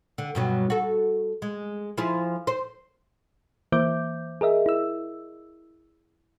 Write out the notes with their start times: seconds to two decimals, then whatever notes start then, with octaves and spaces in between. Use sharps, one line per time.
0.18 D3
0.35 G2 B2 F#3
0.70 F#4 A4
1.42 G#3
1.98 F3 E4 G#4
2.47 C5
3.72 E3 A#3 C5 E5 D6 G6
4.41 G#4 A#4 D#5 E5
4.66 E4 E6